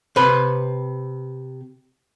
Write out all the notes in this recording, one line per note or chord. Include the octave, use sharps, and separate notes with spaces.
C3 B4